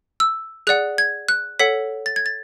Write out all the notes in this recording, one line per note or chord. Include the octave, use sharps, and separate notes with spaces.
E6
G#4 D5 F#5 F#6
G#6
F#6
A4 C#5 F#5 B6
A6
G#6
A6